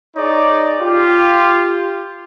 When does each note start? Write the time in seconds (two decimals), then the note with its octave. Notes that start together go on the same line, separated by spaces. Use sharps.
0.16 D#4 G#4 C#5 D5
0.81 F4 G4